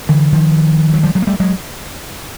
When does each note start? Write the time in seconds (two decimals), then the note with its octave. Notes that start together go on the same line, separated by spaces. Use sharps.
0.09 D3 E3
0.32 D#3 F3
0.94 F#3
1.03 F3 G3
1.15 F#3 G#3
1.22 A#3
1.27 G3 A3
1.40 F#3 G#3